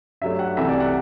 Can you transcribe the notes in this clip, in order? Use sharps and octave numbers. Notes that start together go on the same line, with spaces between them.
G2 F#3 A3 E5
F#5
C2 C3 E3 A3 E5
D5
F#5